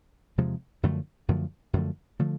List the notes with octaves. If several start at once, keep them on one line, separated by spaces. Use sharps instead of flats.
E2 C3 F3 G#3
F#2 D3 F3 A3
F#2 D3 F3 A3
F#2 D3 F3 A3
D3 F3 A3